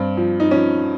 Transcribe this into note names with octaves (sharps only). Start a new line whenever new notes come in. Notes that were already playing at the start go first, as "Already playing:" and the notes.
Already playing: G2 C4
F3
D#4
F3 C#4